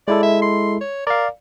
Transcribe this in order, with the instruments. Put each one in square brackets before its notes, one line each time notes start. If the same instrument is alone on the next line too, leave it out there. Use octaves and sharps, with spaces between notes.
[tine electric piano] G#3 E4 A4 [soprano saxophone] D5
[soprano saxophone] E5
C6
C#5
[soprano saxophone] A#4 [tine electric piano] D5 F5